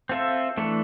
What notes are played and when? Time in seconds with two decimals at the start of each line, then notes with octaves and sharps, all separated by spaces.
0.09 C4 F4 A4 E5
0.57 E3 A3 D4 A4